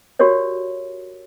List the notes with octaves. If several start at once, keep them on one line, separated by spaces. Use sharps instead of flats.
F#4 G4 A#4 C#5 D5